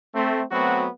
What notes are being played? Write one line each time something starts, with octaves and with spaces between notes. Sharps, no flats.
A3 C4
F#3 A3 B3 C4 F#4